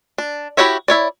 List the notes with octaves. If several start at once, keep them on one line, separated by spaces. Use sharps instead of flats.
D4
E4 F#4 G4 C#5 E5
E4 C#5 D5